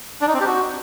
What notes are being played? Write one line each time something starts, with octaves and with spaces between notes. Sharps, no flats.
D4
D#4
C4
G4
F#4